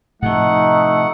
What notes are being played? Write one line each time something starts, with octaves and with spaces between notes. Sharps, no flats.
A2 C3 F3 A3 D#4 F#5